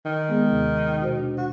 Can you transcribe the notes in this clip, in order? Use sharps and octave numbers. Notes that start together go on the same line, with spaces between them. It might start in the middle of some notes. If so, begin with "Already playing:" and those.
D#3
G#3 B3 G#4
D#2 C3
B2 F#4 C5
D4
F#4